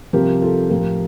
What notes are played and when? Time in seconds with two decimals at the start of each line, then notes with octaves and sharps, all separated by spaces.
0.13 C2 C3 F3 G4 A#4
0.42 F4 A4
0.70 A2 F3 G4 A#4